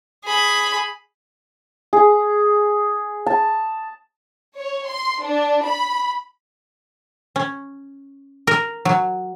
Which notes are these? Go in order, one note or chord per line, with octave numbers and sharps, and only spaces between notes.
G#4 B5
G#4
A5
C#5
C6
D4
B5
C#4
A#4
F#3